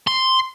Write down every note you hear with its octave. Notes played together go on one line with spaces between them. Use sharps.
C6